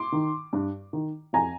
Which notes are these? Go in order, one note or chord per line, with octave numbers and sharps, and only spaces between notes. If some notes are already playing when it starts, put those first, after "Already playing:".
Already playing: C6 D6
D#3
G2
D#3
F2 G#5 A#5